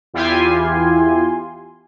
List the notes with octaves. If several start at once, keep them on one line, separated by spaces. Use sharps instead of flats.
E2 E4 F4 G4 G#5 C6